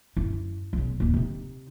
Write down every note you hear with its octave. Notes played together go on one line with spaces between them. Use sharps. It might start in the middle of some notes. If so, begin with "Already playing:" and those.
F#2 E4
B1 C#3
D#1 A#3
C3 D#4